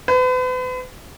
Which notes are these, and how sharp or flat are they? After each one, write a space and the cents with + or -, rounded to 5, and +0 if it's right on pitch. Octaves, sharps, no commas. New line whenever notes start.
B4 +40